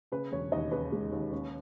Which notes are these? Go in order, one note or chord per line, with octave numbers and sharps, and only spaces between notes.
C#3 B4
E1 C#5
D#2 D#5
C#3 B4
G#3
D#2
C#4